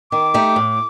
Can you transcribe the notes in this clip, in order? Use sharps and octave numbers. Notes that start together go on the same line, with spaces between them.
D#3 D6
A3 D#4 G4
A2